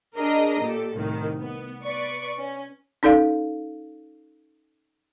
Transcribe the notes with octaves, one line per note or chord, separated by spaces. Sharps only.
D4 G#4 A#4 D#5 A#5
A#2 G4 A4
C2 A2 D#3
B3
B4 D5 C#6
C#4
C#4 D#4 A4 D5 F5